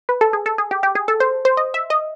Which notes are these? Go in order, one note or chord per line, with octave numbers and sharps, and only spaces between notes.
B4
A4
G#4
A4
G#4
G4
G4
G#4
A4
C5
C5
D#5
E5
D#5